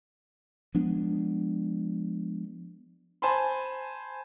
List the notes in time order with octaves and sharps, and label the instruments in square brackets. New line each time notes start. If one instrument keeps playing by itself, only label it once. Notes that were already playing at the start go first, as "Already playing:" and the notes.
[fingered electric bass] F3 G#3 B3 D4
[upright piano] C5 G#5 A5 B5 C6